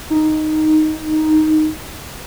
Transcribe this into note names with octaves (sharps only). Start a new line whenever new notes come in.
D#4